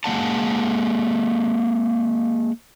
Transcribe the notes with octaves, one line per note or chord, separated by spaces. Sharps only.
G#3 A#3 F#5 A5